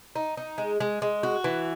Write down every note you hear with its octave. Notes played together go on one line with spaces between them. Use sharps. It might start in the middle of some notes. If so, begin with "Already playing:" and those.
D#4
D#4
G#3
G#3
G#3
F#4
E3